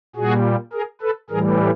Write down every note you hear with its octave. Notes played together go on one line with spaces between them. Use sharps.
A#2 G3 F#4 G#4
G#4 A#4
A4 B4
A2 E3 G3 G#4 A#4